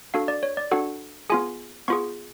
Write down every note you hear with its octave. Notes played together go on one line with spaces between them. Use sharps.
D4 F#4 A4 F5
D5
C#5
D5
D4 F#4 A4 F#5
B3 F4 G#4 G#5
B3 F4 G#4 C#6